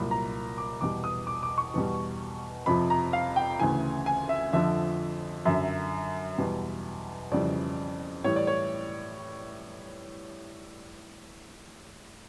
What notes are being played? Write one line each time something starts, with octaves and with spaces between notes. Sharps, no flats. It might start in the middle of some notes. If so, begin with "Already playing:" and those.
Already playing: C2 A#2 F#3 B5
A#5
D6
E2 B2 G3 D6
D#6
D6
D6
C#6
E2 B2 G3
F2 C3 F3 B5
A#5
F5
G5
D2 C#3 E3 G#5
G#5
E5
F2 D3 F3 E5
F#2 D3 F#3 E5
E2 B2 G3
F2 C#3 E3 G3 D5
A2 E3 G3 C#5
D5
C#5